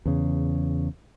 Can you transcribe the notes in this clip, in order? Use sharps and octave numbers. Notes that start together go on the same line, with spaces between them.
E2 C#3